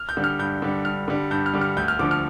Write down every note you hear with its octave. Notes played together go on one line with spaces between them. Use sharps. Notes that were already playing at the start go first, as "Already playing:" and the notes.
Already playing: F6
G6
D3 G3
F6
G2 G6
D3 G3
G2 F6
D3 G3
G2 G6
F6
D3 G3
F6
D2 G6
F6
D3 F3 D6
F6